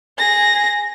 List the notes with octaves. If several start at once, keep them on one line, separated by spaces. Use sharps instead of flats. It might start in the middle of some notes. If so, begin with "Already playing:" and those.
G#4 A#6